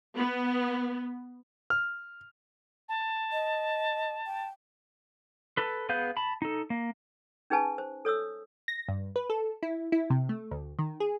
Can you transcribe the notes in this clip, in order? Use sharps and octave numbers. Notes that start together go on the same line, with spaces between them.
B3
F6
A5
D#5
G5
A4 B4
B3 G#4 B4 F5 G6
A5 B5
D#4 A4
A#3
C#4 D#4 G#4 B4 G#5 A5
C5
A4 C#5 D#6 E6
A#6
G2
B4
A4
E4
E4
C3
A3
D2
D#3
G#4